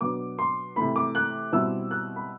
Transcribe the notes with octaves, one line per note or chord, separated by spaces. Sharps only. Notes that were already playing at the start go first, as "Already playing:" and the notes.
B2 F#3 B3 D4 D6
C6
C3 E3 A3 B5
D6
F#6
B2 G3 C4 E4 E6
F#6
B5